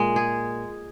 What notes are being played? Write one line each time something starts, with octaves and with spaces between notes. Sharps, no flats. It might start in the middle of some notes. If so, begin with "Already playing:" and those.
Already playing: A#2 G#3
G#4